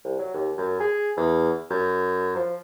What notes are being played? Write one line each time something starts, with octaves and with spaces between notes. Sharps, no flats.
C2
F#3
D#2
F#2
G#4
E2
F#2
F3